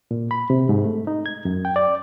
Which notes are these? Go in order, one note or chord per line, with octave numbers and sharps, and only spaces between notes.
A#2
B5
C3
G#2
A3
D#4
G#6
F#2
G5
D5